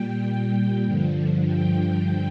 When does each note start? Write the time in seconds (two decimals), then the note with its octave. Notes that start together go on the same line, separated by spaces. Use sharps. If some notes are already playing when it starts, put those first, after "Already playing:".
Already playing: A#2 G3 G5
0.23 G5
0.85 G2 D3 F3
1.46 G5